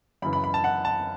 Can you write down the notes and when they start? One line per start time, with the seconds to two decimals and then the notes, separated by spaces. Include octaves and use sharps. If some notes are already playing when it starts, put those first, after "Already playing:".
0.22 F#2 C#3 E3 B5
0.33 B5
0.44 B5
0.54 A5
0.64 F#5
0.85 A5